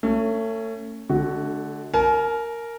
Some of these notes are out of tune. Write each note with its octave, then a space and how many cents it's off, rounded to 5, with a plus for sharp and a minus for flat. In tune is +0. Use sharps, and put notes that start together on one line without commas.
A3 +35 C#4 +0
D3 +0 A3 -35 F#4 +10
A#4 -5 G#5 +40